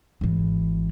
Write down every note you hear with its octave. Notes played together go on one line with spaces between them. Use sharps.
G#1 E3